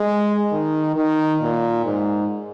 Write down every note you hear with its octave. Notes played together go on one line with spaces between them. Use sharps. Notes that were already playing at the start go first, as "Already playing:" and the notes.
Already playing: G#3
D#3
D#3
A#2
G#2